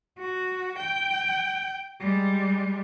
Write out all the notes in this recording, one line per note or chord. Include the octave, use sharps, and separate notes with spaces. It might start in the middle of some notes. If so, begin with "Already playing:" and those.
F#4
G5
G3 G#3